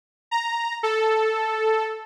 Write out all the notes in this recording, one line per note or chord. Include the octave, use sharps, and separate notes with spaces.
A#5
A4